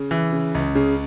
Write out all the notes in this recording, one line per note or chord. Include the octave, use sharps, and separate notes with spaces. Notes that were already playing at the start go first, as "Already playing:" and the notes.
Already playing: C#3
E3
C#3
C#2
C#3